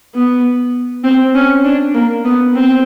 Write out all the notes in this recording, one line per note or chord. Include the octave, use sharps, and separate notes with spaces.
B3
C4
C#4
D4
A#3
B3
C4